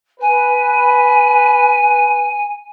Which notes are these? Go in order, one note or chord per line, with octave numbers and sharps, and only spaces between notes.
B4 G#5